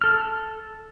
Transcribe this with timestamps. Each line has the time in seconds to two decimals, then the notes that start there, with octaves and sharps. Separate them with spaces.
0.01 A4 F6